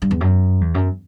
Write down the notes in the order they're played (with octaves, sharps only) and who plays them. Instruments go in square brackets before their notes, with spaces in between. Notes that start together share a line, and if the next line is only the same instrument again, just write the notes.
[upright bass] G2
E2
F#2
E2
F#2